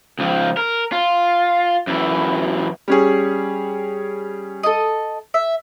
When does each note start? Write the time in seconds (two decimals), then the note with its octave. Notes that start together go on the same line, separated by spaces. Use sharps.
0.19 C#2 F3
0.57 A#4
0.92 F4
1.87 F#2 E3
2.88 G3 C#4 G#4
4.63 A4 D#5
5.34 E5